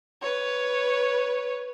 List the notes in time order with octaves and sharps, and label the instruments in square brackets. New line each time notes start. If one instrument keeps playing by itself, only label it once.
[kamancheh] B4 C#5